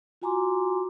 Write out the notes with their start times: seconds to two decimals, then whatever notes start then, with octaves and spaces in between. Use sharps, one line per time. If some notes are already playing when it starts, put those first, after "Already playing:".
0.22 F4 F#4 G#5 A#5 C6 D6